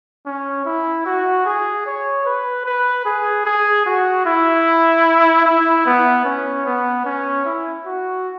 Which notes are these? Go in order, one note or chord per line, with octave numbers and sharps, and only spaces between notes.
C#4
E4
F#4
G#4
C#5
B4
B4
G#4
G#4
F#4
E4
E4
B3
C#4
B3
C#4
E4
F#4